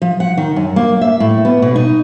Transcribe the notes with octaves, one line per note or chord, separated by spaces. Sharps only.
F3
F#5
D#3
F#2
A#3
E5
A2
B3
B2
D#4